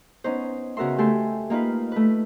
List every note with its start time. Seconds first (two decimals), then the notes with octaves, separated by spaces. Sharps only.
0.24 B3 C#4 D#4 C5
0.77 C#3 B3 F#4 A#4 E5 C6
0.98 A3 G4 A4 G#5 C6
1.50 A#3 D#4 F4 B4
1.92 A3 B4